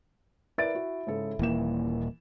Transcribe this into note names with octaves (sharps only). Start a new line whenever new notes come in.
E4 A#4 B4 D5 A6 D7
F#4
G#2 C#3 A4
D#1 E3 A#3 E7